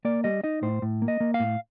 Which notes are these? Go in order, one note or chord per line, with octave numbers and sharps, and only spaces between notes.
A#3 D5
G3 D#5
D#4 D#5
A2 C5
A2
A#3
D#5
A#3
F5
A2